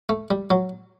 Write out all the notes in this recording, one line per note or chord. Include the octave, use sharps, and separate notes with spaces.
A3
G3
F#3